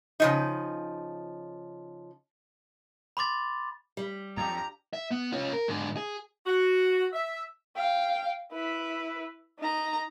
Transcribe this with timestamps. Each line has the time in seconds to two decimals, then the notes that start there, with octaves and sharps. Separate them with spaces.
0.20 C#3 F3 D#4
3.17 B5 C6 D6 A6
3.97 G3
4.37 F2 D4 F4 G4 A#5
4.93 E5
5.11 B3
5.32 C#4 F4
5.53 A#4
5.68 G#2 D3
5.97 G#4
6.46 F#4
7.13 E5
7.77 F5 G5
8.52 E4 B4
9.59 D#4 A#5